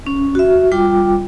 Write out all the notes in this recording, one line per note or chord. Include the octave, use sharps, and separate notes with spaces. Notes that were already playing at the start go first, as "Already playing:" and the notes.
C#4
F#4 E5
G3 F4 G5 D6